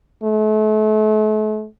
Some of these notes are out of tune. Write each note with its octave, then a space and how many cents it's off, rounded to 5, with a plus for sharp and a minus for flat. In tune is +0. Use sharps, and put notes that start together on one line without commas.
A3 -40